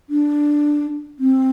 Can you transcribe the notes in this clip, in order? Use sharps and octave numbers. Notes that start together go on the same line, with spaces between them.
D4
C4